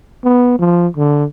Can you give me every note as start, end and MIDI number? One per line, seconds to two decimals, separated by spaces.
0.24 0.57 59
0.59 0.87 53
0.97 1.25 50